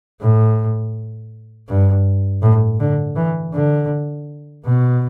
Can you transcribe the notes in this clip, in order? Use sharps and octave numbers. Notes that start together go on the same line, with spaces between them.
A2
G2
A2
D3
E3
D3
B2